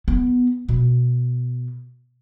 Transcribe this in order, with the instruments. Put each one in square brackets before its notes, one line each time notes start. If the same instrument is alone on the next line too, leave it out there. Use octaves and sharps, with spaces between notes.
[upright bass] B3
B2